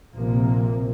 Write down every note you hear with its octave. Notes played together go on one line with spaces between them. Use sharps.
A#1 C3 F3 A#3